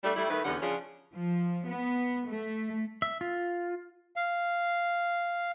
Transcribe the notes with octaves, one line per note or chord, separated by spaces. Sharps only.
G3 A3 D4
G3 A3 E4
D#3 A3 B4
E2 D3 G3 C#4 C#5 F#5
C#3 F3 C#4 D4 F4 G#4
F3
B3
A3
E5
F4
F5